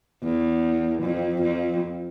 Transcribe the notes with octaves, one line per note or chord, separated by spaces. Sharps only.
E2
F2
F2